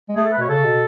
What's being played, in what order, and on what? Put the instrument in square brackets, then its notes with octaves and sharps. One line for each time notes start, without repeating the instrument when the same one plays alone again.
[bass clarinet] G#3
[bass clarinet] A3 [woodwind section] G#4
[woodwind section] A4
B4
[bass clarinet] B2 [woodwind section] C#5
[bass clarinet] C#3 [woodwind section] A4
[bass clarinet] B2